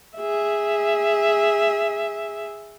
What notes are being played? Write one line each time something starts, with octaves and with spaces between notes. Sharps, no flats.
G#4 E5